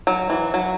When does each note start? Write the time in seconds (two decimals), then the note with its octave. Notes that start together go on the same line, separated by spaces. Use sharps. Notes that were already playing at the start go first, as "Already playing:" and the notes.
0.07 F#3
0.30 E3
0.54 F#3